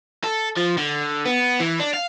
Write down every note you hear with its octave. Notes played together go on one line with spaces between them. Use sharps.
A4
F3
D3
B3
E3
D4
F5